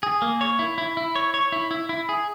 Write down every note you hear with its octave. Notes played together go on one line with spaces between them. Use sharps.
G#4
A#3
C#5
E4
E4
E4
C#5
C#5
E4
E4
E4
G#4